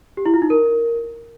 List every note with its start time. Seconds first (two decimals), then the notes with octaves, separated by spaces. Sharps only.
0.17 G4
0.26 E4
0.34 F4
0.42 D#4
0.50 A#4